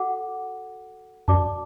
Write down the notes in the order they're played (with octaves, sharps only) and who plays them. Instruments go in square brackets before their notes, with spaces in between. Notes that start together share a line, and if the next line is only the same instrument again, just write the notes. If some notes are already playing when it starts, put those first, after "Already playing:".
Already playing: [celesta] F#4 A4 F#5 D6
[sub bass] F#2 [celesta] F#4 D5 A5 D6